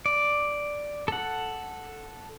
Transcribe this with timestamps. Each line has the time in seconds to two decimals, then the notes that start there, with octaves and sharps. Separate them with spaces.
0.06 D5
1.08 A4 F#5